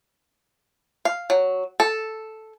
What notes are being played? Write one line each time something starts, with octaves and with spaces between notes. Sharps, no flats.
F5
F#3
A4